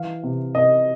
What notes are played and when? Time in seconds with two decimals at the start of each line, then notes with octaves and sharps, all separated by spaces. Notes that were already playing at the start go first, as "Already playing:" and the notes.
Already playing: E3 F5
0.23 C3
0.55 C3 D#5